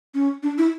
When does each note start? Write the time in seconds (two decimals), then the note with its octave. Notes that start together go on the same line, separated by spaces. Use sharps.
0.14 C#4
0.43 D4
0.58 E4